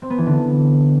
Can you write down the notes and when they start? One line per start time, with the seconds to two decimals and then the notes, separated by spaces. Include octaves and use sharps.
0.02 C4
0.10 B3
0.18 E3
0.26 D3